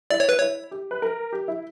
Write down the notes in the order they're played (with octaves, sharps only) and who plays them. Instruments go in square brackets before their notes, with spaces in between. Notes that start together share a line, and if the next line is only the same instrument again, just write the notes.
[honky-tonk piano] E4 [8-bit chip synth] D5
[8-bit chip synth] C#5
B4
[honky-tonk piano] E4 [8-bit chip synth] C#5
[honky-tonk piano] G4
B4
A#4
G4
E4